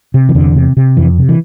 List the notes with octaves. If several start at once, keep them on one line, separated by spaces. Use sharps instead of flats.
C3
E3
E2 D3
C3
C3
F2 E3
C3
E3